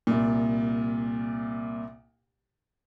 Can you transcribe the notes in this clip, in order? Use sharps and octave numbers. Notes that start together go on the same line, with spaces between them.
C2 A#2